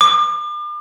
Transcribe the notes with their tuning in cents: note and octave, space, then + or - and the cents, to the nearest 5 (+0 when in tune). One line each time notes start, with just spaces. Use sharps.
D6 +40